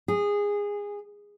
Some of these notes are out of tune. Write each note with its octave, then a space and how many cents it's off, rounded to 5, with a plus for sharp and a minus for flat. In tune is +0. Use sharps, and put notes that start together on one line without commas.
G#4 -20